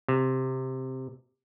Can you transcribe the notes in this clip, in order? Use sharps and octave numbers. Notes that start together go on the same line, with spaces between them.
C3